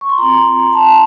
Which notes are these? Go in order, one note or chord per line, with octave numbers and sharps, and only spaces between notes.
C#6
C6
C4 F4 A#5
A5